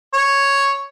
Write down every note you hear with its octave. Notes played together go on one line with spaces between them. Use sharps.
C#5